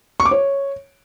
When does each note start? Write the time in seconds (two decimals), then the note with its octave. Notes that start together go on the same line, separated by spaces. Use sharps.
0.20 C#6
0.25 D6
0.31 C#5